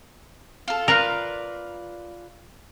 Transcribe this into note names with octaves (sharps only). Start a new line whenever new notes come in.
F4 A4
F4 A#4 B4 D5